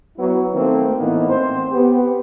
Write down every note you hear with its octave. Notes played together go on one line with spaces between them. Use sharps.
F#3 B3 E4
D#3 A3 A#3 C4
A2 E3 A#3 B3 D#4
C4 C5
B3 G4